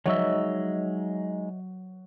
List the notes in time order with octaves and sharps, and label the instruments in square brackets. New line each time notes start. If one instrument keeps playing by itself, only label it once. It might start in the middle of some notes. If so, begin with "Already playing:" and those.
[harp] F#3 [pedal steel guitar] G#3 D#4 E6 [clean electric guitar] C#5 D#5 E5